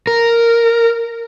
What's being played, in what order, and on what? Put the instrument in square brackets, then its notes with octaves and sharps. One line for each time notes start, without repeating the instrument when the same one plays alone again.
[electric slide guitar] A#4